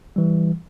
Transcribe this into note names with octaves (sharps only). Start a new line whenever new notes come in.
E3 G3